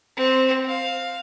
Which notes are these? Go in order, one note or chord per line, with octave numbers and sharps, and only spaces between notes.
C4
F5